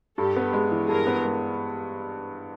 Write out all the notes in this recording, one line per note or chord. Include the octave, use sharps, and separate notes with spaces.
G2 G4 A4
B3
G#3
E3
G2 G#4 A#4
B3
G#3